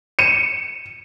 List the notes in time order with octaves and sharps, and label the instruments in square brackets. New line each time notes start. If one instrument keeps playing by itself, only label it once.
[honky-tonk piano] C#7 D#7 E7